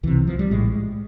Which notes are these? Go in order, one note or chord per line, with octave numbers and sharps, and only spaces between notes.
C2 C3 E3
F3
G3
A#1 A2 G#3